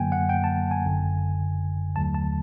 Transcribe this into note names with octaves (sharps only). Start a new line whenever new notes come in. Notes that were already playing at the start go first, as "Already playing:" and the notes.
Already playing: F#2 D3 F#3 A#3 G5 G#5
F#5
G5
A5
G#5
G1 F#2 D3
D#2 D3 F#3 A3 A5
A5